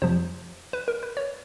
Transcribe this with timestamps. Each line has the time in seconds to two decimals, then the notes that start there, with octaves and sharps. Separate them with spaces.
0.02 F2 C3 F3 C5
0.73 B4
0.88 A#4
1.03 B4
1.17 C#5